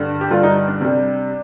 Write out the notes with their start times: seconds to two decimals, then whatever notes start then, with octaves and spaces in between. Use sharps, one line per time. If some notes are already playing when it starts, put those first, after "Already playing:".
Already playing: G2 D3 G3
0.21 G4
0.30 G2 D3 G3 F4
0.43 D#4
0.68 D4
0.81 C3 G3